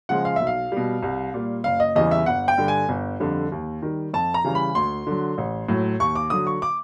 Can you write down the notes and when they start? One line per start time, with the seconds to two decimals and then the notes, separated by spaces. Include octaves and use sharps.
0.09 C#3 F3 G#3 F#5
0.25 F5
0.36 B1 E5
0.47 F5
0.72 B2 G3
1.02 C2
1.34 A#2 G3
1.64 F#1 F5
1.80 D#5
1.96 E2 C#3 E3 G3 D#5
2.11 E5
2.26 G1 F#5
2.48 G5
2.58 G2 D3
2.68 G#5
2.89 G1
3.20 F2 D3 G3
3.52 D#2
3.82 D#3 G3
4.14 F2 A5
4.34 A#5
4.44 C#3 E3 G3
4.55 B5
4.75 D2 C6
5.07 D3 F#3
5.38 A1
5.69 A2 F#3
6.00 D#2 C#6
6.15 D6
6.30 D3 F#3 D#6
6.47 C#6
6.62 D6